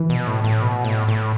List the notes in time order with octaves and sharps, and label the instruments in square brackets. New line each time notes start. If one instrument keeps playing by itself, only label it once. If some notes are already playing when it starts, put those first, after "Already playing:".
Already playing: [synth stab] E3
[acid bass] B2
A2
A2
B2
A2
A2